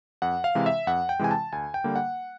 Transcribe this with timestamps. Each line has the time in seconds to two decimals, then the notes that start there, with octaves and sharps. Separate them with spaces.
0.22 F2 F#5
0.44 F5
0.55 C3 E3 G#3
0.66 E5
0.87 F2 F#5
1.09 G5
1.19 C3 E3 G#3 G#5
1.31 A5
1.52 D2 G#5
1.74 G5
1.84 D3 G3 A#3
1.96 F#5